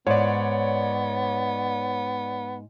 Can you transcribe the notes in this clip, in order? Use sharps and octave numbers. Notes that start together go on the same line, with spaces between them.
G#2 B3 C#5 D5